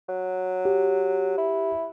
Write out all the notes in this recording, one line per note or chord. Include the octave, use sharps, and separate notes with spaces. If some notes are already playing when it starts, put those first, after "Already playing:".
F#3
G4
E4